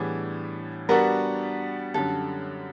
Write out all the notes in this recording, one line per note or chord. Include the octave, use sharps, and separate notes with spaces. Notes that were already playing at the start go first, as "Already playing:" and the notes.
Already playing: A2 E3 G3 B3 D4 G#4
G3 B3 D4 F#4 A#4
F#2 D3 G3 A4